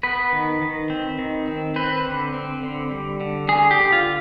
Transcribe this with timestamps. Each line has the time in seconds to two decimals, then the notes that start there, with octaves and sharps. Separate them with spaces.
0.03 B3 B4
0.32 D#3
0.62 D#3
0.90 C4
1.19 D#3
1.48 C4
1.76 C4 B4
2.05 D3
2.34 C4
2.63 D3
2.91 G3
3.21 D3
3.48 D3 G#4
3.71 G4
3.78 D3
3.92 F4